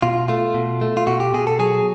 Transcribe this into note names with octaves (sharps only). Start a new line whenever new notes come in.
B2 F4
A3 F4
B2
A3
F4
B2 F#4
G4
B2 G#4
A4
F#3 G#4